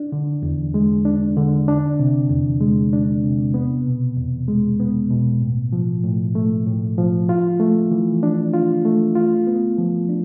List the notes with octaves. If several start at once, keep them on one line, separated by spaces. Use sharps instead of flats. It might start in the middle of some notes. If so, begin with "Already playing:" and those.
Already playing: D4
D3
E2
G#3
D4
D3
D4
C3
E2
G#3
D4
C3
B3
B2
E2
G#3
B3
B2
A2
F3
A2
A3
A2
F3
F4
A3
E3
D4
F4
A3
F4
B3
F3
D4